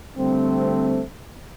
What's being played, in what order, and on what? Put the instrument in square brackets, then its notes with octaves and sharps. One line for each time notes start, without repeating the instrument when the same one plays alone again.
[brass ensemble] D3 G3 A3 C4